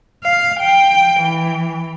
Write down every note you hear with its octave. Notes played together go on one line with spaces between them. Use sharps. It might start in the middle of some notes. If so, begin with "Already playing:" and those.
F5
G5
E3